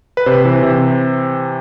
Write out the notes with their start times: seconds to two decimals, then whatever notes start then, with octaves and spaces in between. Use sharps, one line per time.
0.17 B4
0.26 C3 C5
0.45 E3
0.63 C3